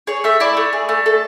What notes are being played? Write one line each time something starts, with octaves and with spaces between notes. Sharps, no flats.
G#4 C#5
A3 E5
E4 D5
A3
G#4
A3
A4